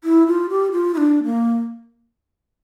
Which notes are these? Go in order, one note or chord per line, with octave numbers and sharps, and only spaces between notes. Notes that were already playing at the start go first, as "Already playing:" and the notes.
E4
F4
G4
F4
E4
D4
A#3